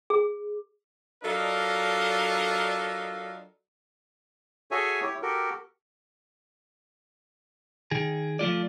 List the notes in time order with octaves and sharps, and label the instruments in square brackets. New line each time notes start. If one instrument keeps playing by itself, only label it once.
[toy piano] G#4
[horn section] F#3 D4 F4 A4 A#4 D#5
[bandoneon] F#4 G#4 A4 C#5 E5 G#5
E4 G4 C#5
F#4 G4 A4 A#4
[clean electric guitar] D#3 G#4
F3 A3 F4 D5